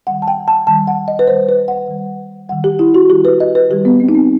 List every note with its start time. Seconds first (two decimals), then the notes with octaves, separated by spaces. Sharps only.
0.07 D#3 G3 F#5
0.22 A5
0.28 G5
0.48 A5
0.67 D#3 G3 A5
0.87 F#5
1.08 D#5
1.19 B4
1.27 D#3 G3 C5
1.49 B4
1.68 F#5
1.88 D#3 G3
2.49 D#3 G3 F#5
2.64 G4
2.79 E4
2.95 F#4
3.09 D#3 G3 G4
3.25 B4
3.40 D#5
3.55 B4
3.70 D#3 G3 G4
3.85 B3
4.00 C4
4.09 D#4
4.15 C4